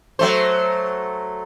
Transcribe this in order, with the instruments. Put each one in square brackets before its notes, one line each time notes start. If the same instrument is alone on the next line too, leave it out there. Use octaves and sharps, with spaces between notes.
[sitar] F#3 A3 C5